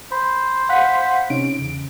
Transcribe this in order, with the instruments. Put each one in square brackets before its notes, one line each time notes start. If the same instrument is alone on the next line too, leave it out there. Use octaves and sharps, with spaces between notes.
[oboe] C5 [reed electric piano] B5
[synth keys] F5 F#5 B6
[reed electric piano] C3 C#4 D#4 [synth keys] D7
[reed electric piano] E2 C#3